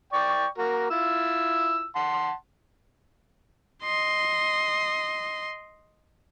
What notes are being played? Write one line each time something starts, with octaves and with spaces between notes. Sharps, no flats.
D5 G5 C#6
A#3 F#4 A#4
E4 F4 E6
F#5 A5 C6
D#5 C6